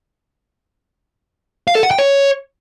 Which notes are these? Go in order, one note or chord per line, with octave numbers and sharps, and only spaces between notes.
F5
A4
F#5
G5
C#5